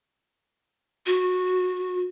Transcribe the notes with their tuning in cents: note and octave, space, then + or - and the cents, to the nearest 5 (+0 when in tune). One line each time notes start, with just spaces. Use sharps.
F#4 -20